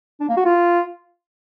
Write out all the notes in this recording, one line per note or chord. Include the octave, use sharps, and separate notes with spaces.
D4
A#3
F#4
F4